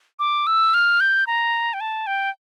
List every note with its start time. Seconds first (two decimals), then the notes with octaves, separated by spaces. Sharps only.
0.19 D6
0.47 E6
0.74 F6
1.00 G6
1.27 A#5
1.74 G5
1.81 A5
2.07 G5